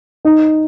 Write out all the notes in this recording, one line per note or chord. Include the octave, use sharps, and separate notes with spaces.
D#4